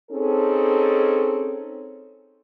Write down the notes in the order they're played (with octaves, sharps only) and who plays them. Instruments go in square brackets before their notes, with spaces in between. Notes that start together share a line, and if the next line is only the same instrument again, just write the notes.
[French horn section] C4 C#4 D#4 G#4 A4